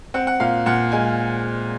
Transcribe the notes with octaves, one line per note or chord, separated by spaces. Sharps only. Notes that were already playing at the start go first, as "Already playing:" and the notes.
C4 F#5
F#5
A#2 F5
A#2 F#5
G#3 G#5